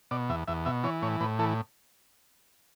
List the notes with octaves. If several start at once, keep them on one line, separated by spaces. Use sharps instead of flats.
B2 D5
E2 E5
E2 E5
B2 E5
E3 C#5
A2 C#5
A2 B4
E3 A4